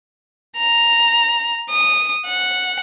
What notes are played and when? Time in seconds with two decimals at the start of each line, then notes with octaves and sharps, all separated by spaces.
0.57 A#5
1.71 D#6
2.27 F#5